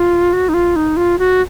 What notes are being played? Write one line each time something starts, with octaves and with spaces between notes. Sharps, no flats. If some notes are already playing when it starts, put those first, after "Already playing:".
Already playing: F4
F#4
D#4
F4
D#4
F4
F#4